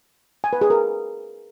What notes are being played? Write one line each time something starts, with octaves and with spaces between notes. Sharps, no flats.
G#5
B4
G#4
A#4